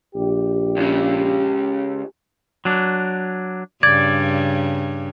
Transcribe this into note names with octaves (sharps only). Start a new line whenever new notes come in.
A#1 G4
C#2 C#3
F#3 D4
G2 C#3 D5 G#6